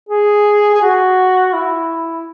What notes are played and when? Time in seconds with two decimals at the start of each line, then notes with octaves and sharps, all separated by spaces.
0.09 G#4
0.74 G#4
0.81 F#4
1.53 E4